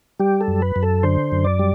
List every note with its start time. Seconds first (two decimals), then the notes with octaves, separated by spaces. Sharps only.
0.20 G3 G4
0.41 A4
0.48 F#2
0.62 B4
0.76 F#2
0.83 A4
1.03 D3 C5
1.32 F#2
1.45 D5
1.59 G3